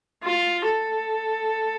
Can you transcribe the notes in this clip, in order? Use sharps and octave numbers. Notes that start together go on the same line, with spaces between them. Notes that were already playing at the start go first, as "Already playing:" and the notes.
F4
A4